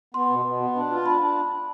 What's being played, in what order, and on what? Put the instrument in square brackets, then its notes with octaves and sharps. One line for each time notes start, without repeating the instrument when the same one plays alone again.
[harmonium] B3 [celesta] C6
[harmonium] B2
B2
B3
D4
F4
[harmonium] D4 [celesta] B5
[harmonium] D4